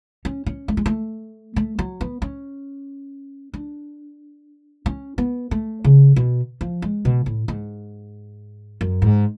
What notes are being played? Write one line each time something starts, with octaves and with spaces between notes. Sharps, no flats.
C#4
C#4
A3
G#3
A3
A3
F#3
B3
C#4
D4
C#4
B3
A3
C#3
B2
F3
G#3
B2
A2
G#2
F#2
G#2